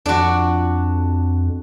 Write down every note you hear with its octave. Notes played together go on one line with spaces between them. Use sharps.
F2 D4 F#4